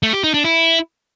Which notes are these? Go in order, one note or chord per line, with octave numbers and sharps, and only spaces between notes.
A3
G4
D#4
D4
E4